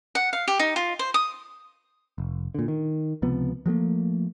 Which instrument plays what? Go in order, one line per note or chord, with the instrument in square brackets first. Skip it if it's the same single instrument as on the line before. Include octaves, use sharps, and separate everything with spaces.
[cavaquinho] F#5
F5
G4
D#4
F4
C5
D#6
[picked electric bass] F1
A#2 D3
D#3
C#2 C3 F3 B3
F3 F#3 A3 A#3